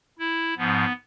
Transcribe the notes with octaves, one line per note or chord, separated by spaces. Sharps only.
E4
G#2 F3 B3